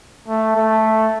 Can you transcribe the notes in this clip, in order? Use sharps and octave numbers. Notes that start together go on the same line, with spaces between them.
A3
A3